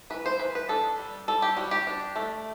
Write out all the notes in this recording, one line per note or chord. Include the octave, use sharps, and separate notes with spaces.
E3 B4
C5
E3 B4
B4
D4 A4
G3
G3 A4
G4
G3 F#4
G4
D4
A3